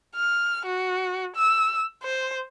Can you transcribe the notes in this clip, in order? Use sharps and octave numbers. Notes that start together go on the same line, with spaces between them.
F6
F#4
E6
C5